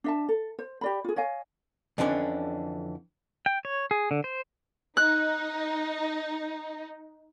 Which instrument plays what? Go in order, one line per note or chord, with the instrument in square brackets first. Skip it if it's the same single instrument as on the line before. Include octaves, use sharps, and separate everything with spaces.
[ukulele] D4 E5 A5
A4
C5
G4 D5 B5
F4 G#4
C#5 D#5 F5 G#5
[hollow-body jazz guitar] F2 D3 E3 B3 C#4 D4
[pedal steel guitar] G5
C#5
G#4
D3
C5
[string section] D#4 [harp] F#6